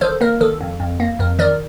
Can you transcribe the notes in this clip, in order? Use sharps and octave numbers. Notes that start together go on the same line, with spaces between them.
D#3 A4 C5
A#3 A#4
D#3 A4
F2
F2
A#3
F2 A#4
D#3 A#4 D5